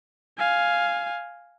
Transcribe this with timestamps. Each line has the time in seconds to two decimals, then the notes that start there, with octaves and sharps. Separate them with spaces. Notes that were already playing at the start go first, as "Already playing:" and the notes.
0.38 F5 G#5